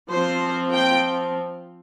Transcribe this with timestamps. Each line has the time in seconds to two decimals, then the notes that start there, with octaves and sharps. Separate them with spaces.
0.11 F3 C4 C5
0.74 G5